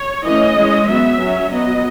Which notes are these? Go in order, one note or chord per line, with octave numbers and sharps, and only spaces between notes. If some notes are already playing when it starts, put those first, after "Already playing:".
Already playing: C#5
E3 A3 C#4 D#5
E3 G#3 C#4
F#3 B3 E5
F#3 C#4
F#3 B3 D#5